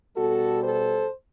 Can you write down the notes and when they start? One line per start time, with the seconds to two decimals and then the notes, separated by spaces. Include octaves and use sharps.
0.16 B2 G3 B3 F#4 A4
0.63 A4 C5